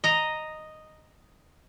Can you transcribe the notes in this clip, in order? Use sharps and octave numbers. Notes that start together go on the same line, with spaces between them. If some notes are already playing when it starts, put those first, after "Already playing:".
D#5 A#5